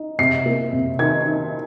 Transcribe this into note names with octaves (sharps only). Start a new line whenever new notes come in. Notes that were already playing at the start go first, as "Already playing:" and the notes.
Already playing: D#4
C3 C7
A#3
C3
D#3 G#6
D#3